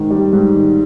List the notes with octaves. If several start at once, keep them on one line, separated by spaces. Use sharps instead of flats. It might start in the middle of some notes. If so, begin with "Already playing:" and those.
Already playing: G#2 D#3
G3
G#2
D#3